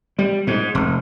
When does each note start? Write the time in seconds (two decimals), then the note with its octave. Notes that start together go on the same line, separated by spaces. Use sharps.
0.19 G3
0.47 G#2
0.75 F1